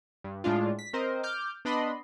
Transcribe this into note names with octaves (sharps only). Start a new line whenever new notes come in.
G2
A2 G#3 D4 F4
B6
C4 A#4 C5 D#5
D6 F6 G6
B3 D4 D#5 B5 C6